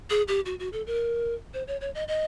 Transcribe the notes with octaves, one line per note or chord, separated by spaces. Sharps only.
G#4
G4
F#4
F#4
A4
A#4
C5
C#5
C#5
D#5
D#5